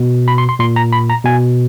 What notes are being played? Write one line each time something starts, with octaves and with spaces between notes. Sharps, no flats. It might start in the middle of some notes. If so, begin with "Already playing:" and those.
Already playing: B2
B5
C6
C6
A#2 C6
A#5
B5
A#5
B2 G#5